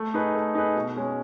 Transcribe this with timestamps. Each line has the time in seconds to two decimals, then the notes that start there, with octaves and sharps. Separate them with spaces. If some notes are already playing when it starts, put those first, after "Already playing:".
Already playing: A3
0.14 D#4 G#4 B4
0.35 A3
0.55 D#4 G#4 B4
0.76 B2
0.96 G#3 C#4